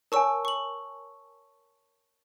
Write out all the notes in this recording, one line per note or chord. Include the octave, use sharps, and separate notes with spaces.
A#4 C#5 G#5 A5 C#6 E6
C#6 F#7